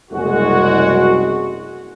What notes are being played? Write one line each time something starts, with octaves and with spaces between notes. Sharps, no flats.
F#1 C2 G#3 F#4